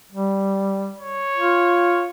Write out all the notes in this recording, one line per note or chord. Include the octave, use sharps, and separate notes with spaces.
G3
C#5
F4